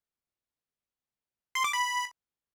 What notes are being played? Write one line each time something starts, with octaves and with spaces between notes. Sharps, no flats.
C6
D6
B5